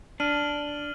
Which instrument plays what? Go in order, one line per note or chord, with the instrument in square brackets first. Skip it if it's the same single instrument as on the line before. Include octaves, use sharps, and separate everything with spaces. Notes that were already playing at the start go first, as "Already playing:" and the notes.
[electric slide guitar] D4 [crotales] F6 D#7 F#7